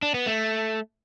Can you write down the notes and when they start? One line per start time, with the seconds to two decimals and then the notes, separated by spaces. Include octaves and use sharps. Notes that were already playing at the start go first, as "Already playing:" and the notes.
0.02 D4
0.14 B3
0.26 A3